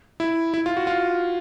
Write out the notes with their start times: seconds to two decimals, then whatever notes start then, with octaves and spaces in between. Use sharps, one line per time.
0.20 E4
0.54 E4
0.66 F4
0.77 F#4
0.87 F4